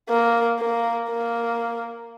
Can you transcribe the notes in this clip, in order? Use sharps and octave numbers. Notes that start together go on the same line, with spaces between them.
A#3
A#3
A#3